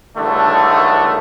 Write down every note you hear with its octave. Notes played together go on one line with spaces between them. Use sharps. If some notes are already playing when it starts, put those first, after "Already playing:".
C#2 G2 D3 D#3 A3